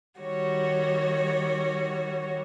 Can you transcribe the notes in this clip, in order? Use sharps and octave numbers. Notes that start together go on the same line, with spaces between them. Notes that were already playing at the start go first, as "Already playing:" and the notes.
D#3 G3 F#4 C#5